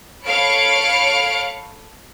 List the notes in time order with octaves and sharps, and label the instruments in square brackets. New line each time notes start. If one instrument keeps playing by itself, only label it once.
[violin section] A4 C#5 F5 B5 C#7 D7